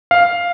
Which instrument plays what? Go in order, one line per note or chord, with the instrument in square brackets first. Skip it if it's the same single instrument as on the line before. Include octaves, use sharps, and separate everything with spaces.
[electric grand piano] F5